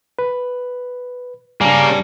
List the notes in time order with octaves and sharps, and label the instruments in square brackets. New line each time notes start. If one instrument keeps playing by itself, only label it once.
[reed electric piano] B4
[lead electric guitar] G3 D4 [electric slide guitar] A#3 [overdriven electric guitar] C#4 G#4